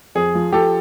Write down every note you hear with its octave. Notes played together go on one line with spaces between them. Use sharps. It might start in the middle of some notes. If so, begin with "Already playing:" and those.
F2 G#4
F3
F3 G4 A4